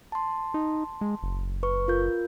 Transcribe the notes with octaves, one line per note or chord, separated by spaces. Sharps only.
A5 C6
D#4
G#3
F#1
B4 C#6
F4 A#4 G6